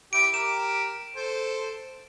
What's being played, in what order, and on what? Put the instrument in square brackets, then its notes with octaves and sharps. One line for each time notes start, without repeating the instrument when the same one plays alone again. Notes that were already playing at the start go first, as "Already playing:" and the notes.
[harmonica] E4 G4 [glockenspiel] D7
[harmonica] G4 A#4 [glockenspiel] E7
[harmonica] A4 C5